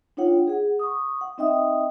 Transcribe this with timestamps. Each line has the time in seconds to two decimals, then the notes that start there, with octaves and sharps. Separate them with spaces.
0.17 D4 D#4 F4 C#5 F#5 G5
0.47 G#4 F#5
0.79 C#6 D#6
1.21 F#5
1.38 C4 D#4 D#5 E5 G5 D#6